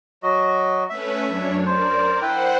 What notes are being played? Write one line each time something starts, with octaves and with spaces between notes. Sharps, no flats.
F#3 F#4 D#5
A3 C#4 B4 E5
F#2 D4 C#5
A#4 C5 D5
E4 B4 C5 F#5 G5